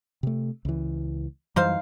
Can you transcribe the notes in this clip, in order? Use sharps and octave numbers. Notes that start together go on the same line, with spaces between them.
C3 A3
C#2 E3
F#2 E3 G3 D#4 C5 F5